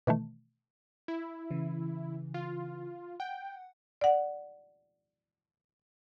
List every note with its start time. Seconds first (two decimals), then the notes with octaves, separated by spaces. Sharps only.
0.07 B2 D#3 E3 A3
1.08 E4
1.51 C#3 E3
2.34 F4
3.20 F#5 G5
4.01 D5 F#5